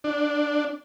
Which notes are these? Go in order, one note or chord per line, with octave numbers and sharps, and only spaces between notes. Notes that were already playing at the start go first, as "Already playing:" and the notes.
D4